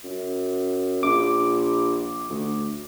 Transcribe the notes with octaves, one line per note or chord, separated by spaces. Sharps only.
F#2
A#1 D6
D2